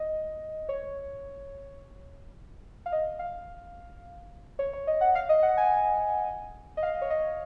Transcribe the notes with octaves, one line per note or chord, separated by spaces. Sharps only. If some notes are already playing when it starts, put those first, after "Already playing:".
Already playing: D#5
C#5
F5
D#5
F5
C#5
C#5
D#5
F#5
F5
D#5
F#5
G#5
D#5
F5
C#5
D#5